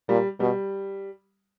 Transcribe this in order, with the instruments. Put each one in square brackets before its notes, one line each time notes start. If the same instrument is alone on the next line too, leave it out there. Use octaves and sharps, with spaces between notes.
[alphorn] A#2 [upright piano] G3
[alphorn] B2 [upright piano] G3